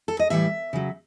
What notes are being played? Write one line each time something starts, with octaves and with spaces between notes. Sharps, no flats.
A4
D#5
A2 E3 G3 E5
C#3 F#3